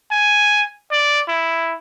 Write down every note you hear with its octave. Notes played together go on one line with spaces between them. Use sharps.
G#5
D5
E4